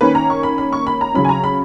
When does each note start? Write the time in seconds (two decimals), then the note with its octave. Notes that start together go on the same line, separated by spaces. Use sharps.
0.01 D#3 A#3 C#4 B4
0.15 A#5
0.30 C#6
0.43 B5
0.58 B5
0.72 C#6
0.87 B5
1.01 A#5
1.14 C#3 F#3 C#4 B5
1.25 G#5
1.29 A#5
1.44 B5